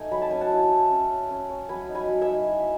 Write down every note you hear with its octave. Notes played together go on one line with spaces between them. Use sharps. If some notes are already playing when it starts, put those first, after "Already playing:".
Already playing: A3 D#4 G#5
F#3 B5
A5
C#4 G#5
F#5 A5
E4
E4
C#4
C#4
C#4
C#4
F#3 G#5 B5
D#4
G#5 B5
F#3
E5 G#5
D#4
E4